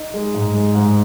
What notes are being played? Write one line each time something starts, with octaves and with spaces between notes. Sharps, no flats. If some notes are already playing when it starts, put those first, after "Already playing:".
Already playing: D#4
G#3
G#2
G#3
G#2